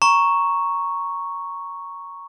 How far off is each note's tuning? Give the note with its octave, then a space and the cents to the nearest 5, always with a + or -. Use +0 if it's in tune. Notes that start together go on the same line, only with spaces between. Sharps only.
A#5 +0 C#6 +0